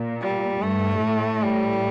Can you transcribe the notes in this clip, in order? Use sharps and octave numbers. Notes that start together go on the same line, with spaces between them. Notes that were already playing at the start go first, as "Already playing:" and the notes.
Already playing: A#2
G3
G2 A3
A2
G3